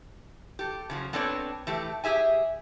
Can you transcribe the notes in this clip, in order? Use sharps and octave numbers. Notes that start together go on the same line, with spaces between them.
G4 A4
C#3 F3 F#3
B3 C4 D4 A4 C#5 D5
E3 A3 G4
G4 G#4 E5 G#5